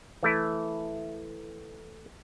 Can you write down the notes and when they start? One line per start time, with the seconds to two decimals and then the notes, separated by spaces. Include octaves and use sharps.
0.23 E3 A3 E4